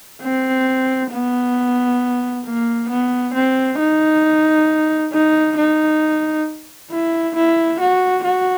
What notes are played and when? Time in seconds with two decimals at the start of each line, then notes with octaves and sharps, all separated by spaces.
0.22 C4
1.12 B3
2.45 A#3
2.90 B3
3.34 C4
3.79 D#4
5.13 D#4
5.57 D#4
6.91 E4
7.35 E4
7.80 F#4
8.24 F#4